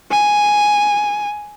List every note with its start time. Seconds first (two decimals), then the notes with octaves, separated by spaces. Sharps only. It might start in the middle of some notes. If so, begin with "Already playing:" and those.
0.11 G#5